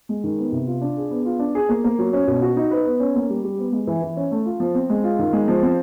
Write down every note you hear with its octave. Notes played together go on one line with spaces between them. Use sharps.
G#3
D#3
B3
C3
F4
D4
G#4
B3
F4
D4
G#4
A#3
A#3
F#3
C#4
B2
F#4
D#4
B4
B3
C#4
A#3
G3
G3
B3
G#3
E3
E3
C#4
A3
F4
F3
C4
G#3
F4
D#3
G#3
F3
C4